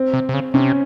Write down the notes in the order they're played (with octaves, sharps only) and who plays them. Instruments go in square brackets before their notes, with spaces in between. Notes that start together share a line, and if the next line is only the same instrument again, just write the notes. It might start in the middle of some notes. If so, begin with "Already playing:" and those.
Already playing: [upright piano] C4
[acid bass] C3
C3
C#3
[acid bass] C3 [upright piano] C#4